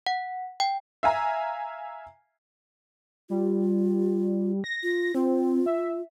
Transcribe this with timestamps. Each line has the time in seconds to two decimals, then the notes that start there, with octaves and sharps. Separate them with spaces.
0.07 F#5
0.60 G5
1.03 E5 F5 G#5 A#5
3.30 G3 F4
4.64 A#6
4.83 F4
5.15 C4 F4
5.66 E5